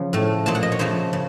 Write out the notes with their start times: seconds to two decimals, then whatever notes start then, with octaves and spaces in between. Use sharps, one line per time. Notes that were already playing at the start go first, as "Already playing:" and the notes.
Already playing: C#3 F3
0.13 A2 A3
0.46 A#2 F3 A#3 A5
0.55 F#5
0.63 D#5
0.72 C#5
0.79 C#3 F3 A3 C5
1.13 C#3